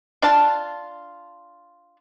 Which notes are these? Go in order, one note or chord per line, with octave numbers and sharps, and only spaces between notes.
D4 F4 A5